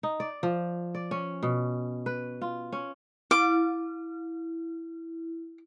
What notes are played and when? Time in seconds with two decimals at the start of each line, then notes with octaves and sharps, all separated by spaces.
0.03 D#4
0.20 D5
0.43 F3
0.95 D5
1.11 C#4
1.43 B2
2.06 B4
2.42 F4
2.72 C#4
3.31 E4 D6